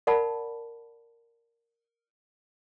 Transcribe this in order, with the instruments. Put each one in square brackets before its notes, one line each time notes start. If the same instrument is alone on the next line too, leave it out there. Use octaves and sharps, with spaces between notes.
[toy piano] A#4 D5 F#5 A5 B5